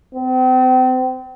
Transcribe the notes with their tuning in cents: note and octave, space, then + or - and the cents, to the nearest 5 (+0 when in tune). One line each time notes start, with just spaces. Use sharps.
C4 -35